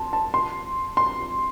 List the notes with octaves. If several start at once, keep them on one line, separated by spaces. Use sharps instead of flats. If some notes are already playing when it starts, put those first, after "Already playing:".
Already playing: A5 C6
A5
C6
C6